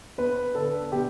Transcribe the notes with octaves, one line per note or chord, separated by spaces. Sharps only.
B3 B4
D3 A4
B2 G4